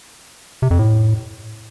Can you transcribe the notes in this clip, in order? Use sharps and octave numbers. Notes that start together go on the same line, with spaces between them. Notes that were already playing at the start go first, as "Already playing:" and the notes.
C3
F2
A2